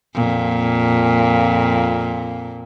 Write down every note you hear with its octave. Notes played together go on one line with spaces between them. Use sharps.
F2 A#2